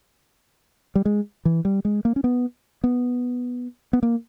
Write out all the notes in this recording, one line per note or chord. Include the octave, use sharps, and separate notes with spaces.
G3
G#3
E3
G3
G#3
A#3
C#4
B3
B3
B3
A#3